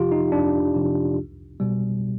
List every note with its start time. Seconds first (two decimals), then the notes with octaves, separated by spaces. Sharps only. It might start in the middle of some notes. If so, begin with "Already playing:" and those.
Already playing: F2 C3 F3 F4 G4
0.12 D#4
0.32 F2 D4
0.75 C3 F3
1.17 C2
1.60 B2 G3